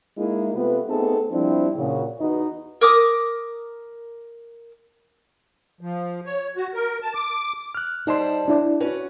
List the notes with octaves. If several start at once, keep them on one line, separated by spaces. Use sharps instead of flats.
G#3 A#3 D#4 E4
C3 A3 B3 C4 F4 B4
A3 B3 C4 D#4 G#4 A4
F3 G3 C4 D4 E4
A#2 C#3 F#4
E2 D#4 F#4 B4 D#5
A#4 D6 D#6
F3
C#5
F#4
A#4
A5
D6
F6 F#6
G3 D#4 C5 D#5 A5 C6
D4 E4 D5
C#4 F#4 B4